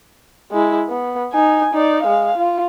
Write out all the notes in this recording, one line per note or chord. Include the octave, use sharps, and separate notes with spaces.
G#3 E4
B3
D#4 G#5
D#4 D5
G#3 F5
F4